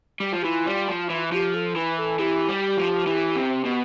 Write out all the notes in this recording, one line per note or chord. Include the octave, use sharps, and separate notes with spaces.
G3
F3
G4
E3 F4
G3
F3
E3
F3 G4
A4
E3 B4
A4
E3 G4
G3
F3
E3
C3
B2